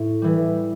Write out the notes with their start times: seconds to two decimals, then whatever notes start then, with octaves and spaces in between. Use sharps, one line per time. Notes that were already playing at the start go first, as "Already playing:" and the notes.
Already playing: A2
0.22 E3 G3